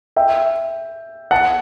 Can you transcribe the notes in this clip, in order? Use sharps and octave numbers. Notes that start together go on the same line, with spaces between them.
E5 G5
F#5 A5